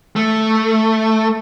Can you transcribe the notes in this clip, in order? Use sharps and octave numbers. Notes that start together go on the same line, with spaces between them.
A3